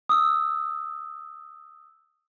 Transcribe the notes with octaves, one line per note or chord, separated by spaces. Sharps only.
D#6 E6